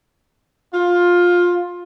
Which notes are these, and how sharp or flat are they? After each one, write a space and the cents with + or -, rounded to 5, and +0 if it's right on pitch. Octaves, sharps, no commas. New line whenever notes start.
F4 +15